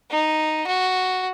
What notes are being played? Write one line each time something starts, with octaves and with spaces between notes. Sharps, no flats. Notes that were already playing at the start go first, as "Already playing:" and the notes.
D#4
F#4